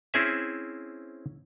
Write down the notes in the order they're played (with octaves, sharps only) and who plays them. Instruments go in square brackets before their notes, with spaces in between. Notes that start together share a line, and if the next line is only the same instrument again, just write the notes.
[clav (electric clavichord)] C4 C#4 E4 G#4 C5 E5